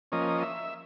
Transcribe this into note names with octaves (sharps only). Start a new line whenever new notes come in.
F3 A#3 C#4 D#5
E5